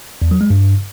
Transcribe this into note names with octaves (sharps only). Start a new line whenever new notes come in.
E2
F#3
G#3
G2